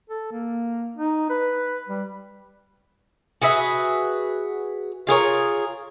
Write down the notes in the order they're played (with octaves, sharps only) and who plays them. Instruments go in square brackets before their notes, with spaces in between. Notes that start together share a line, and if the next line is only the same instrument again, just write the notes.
[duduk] A4
A#3
D#4
B4
G3
[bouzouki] F#4 G#4 B4 E5
F4 G#4 A#4 C#5